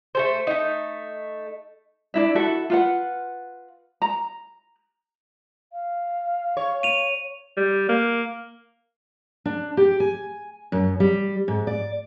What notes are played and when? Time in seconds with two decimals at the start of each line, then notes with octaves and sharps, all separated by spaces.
0.15 A3 A4 C5
0.47 A3 D#4
2.14 D4 E4 E5
2.35 E4 F#4 A4 E5
2.70 F4 B4 F#5
4.02 A#5
5.73 F5
6.57 C#5
6.83 D#7 F7
7.57 G3
7.89 A#3
9.45 D4
9.77 G4
10.00 G#5
10.72 F#2
11.00 G3
11.48 G#2
11.67 D5